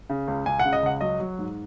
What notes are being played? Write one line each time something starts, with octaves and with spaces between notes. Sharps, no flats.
C#3
C#2
C#2 G#5
F#5
C#3
D#5
C#2 F#5
F#3 D#5
F#3
G#2